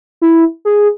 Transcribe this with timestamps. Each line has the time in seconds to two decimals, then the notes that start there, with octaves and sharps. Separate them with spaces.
0.22 E4
0.65 G#4